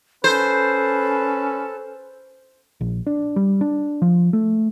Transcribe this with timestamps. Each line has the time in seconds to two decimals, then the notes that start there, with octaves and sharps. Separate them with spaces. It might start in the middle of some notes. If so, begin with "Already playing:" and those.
0.24 C#4 A4 B4 C5
2.81 A#1
3.07 D4
3.36 G3
3.61 D4
4.02 F3
4.33 A3